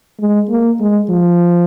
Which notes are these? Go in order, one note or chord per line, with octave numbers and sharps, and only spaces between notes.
G#3
A#3
G#3
F3